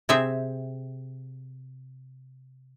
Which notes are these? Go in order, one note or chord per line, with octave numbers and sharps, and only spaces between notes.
C3 C4 G#4 E5